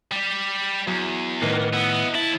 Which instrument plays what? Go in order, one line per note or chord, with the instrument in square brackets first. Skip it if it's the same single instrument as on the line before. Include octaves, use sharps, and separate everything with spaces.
[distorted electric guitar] G3 G4
[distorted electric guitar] E2 [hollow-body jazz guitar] F#3
[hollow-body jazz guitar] A2 D#3 D#4 [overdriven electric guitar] A#3 B3
[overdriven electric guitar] B3 [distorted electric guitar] E4 D#5
[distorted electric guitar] D#2 A5 [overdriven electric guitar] E4